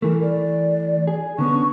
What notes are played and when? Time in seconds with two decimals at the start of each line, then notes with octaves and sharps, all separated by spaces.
0.02 E3 A3 A#4
0.22 D5
1.07 G#4
1.38 D3 B3 C#4 C#6